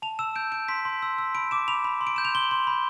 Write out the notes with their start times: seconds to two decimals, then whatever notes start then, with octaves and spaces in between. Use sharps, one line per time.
0.02 A5 F7
0.19 E6 E7
0.36 G6 D7
0.52 G6 D7
0.68 C6 B6
0.85 C6
1.02 E6
1.18 E6
1.35 B5 D7
1.51 D6 E7
1.68 B5 F7
1.84 B5
2.01 C6
2.07 D7
2.16 G6 E7
2.25 F7
2.35 C6 G7
2.51 C6
2.67 B5